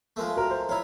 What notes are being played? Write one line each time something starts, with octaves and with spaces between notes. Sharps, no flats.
F3 G#3 A3 A#4
F#4 A#4 A#5
C5
E4 F4 C#5 A#5